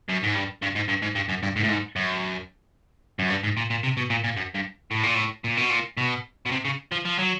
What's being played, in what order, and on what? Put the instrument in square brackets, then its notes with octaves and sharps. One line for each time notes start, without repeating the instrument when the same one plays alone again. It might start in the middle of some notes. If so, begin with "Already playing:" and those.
[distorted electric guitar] F#2
G#2
G2
G2
G#2
G2
G#2
G2
F#2
G2
G#2
A2
G#2
F#2
F#2
G2
G#2
A#2
A#2
C3
B2
A#2
A#2
F#2
G2
A2
A#2
A2
A#2
B2
A#2
B2
B2
C3
C#3
F3
F3
F#3